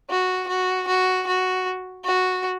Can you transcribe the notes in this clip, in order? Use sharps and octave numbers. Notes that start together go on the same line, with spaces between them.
F#4
F#4
F#4
F#4
F#4